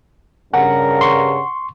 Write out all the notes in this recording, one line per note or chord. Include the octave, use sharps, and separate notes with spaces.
G2 C#3 A#4 F#5
C6 C#6